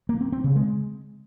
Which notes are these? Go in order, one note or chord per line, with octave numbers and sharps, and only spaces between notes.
A#3
C4
C4
C#3
G#3